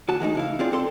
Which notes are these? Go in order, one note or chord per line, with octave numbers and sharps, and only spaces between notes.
D2 F#4 A5
E3 G#3 A3 D#4
C#3 E4 F5
C4 F4 G#4 D5
C4 A4 C6